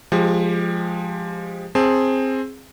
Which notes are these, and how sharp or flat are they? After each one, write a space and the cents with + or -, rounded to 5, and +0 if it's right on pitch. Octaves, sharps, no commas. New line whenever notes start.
F3 +0 G#3 +0 G4 +20
C4 +10 G#4 +0 A5 +0